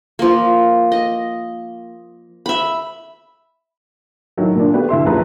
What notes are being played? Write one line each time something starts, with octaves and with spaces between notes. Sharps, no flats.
F3 A#3
D#5
E5 B5
A2 D#3 F#3
A#2 A#3 D4
A3 B3 F#4 G4 B4
D2 E4 E5 C6
A#1 F#2 F3 G#4 B4 A#5